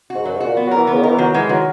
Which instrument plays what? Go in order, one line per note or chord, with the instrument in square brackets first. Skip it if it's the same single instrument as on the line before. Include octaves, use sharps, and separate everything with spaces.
[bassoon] G#2 [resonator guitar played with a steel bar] F#4
[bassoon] F#2 [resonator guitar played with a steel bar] F#3
[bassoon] G#2
[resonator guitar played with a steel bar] F#4
[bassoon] A#2
[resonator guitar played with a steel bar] B3
[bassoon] F#3 [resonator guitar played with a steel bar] A#4
[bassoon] E3
[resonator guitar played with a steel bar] B3
[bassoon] C#3
[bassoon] D#3 [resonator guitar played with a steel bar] A#4
[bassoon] E3
[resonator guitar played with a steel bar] D#3 [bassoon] F#3
[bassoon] E3 [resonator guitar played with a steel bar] G#3
[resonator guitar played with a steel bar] D#3 [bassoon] F#3